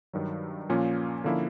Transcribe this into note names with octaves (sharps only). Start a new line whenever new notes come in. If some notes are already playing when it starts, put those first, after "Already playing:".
G2 D#3 F#3
A#2 F3 A#3 C#4 F4
D3 F3 A#3 C#4 E4